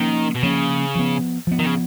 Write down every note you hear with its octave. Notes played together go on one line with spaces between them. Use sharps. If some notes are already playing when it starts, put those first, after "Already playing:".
Already playing: D#3 F3 A#3 C#4
B2
C#3 F3 A#3 C#4
F3 B3
F3 B3
D#3
C#3